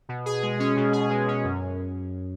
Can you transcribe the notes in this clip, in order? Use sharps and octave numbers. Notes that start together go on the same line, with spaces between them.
B2
G#4
G#3
C#4
B2
G#4
G#3
C#4
F#2